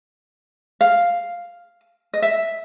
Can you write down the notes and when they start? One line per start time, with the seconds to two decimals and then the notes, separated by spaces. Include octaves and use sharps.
0.81 F5
2.14 D#5
2.22 E5